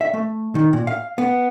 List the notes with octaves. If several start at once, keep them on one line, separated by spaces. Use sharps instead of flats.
E5
A3
D#3
A#2
F5
B3